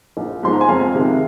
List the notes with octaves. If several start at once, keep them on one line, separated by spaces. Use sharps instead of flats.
A#1
G#2 F3 G#3 C6
A#5
G#5
F2 F5
C3 D#3 G#3